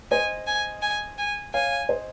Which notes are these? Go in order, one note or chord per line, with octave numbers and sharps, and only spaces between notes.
C5 D#5 G#5
G#5
G#5
G#5
C#5 F5 G#5
C5 D#5